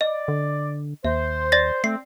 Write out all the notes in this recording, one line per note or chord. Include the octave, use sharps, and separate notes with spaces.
D5 D#5
D3
D#2 C5 E5
D5 A6 A#6
A3 C4 C7